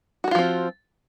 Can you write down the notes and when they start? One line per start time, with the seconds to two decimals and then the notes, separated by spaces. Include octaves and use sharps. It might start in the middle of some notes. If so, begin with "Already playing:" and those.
0.24 F#4
0.28 A#4
0.31 F4
0.35 F3
0.39 C4